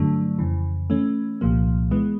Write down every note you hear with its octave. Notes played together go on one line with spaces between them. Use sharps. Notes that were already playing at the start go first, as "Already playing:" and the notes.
Already playing: G2 D3 F#3 A3
F2 C#3 E3
E3 A3 C#4
C2 A#2 F3 A#3
E3 G#3 B3